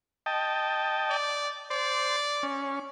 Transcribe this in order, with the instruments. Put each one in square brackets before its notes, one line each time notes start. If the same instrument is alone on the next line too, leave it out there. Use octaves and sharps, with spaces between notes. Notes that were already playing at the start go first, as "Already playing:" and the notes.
[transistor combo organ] D#5 G5 A5
[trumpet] D5
[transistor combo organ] C5 [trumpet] D5
[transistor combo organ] C#4